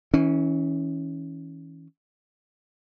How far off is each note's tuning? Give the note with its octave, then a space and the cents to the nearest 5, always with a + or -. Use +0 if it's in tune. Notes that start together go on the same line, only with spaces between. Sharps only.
E3 -35 C#4 +0